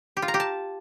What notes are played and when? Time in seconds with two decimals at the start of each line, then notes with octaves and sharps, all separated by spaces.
0.17 G4
0.22 F4
0.28 A#5
0.34 G4
0.40 A5